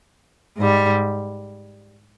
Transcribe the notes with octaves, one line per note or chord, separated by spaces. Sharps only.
G#2 G3